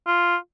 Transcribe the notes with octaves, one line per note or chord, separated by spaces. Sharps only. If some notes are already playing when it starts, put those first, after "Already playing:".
F4